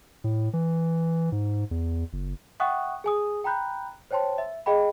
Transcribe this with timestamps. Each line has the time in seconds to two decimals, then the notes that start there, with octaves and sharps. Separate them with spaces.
0.24 A2
0.53 E3
1.32 G#2
1.71 E2
2.13 F#1
2.60 E5 F#5 G5 C#6 D#6 F#6
3.04 G#4 G#5 D#6
3.44 G5 A#5 B5 F#6 G6
4.11 C5 C#5 G5 A5 C6
4.38 E5
4.66 G#4 D#5 F5 G5 B5